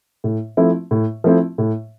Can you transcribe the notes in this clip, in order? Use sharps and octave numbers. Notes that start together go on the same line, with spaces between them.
A2
F3 A3 C4 E4
A2
F3 A3 C4 E4
A2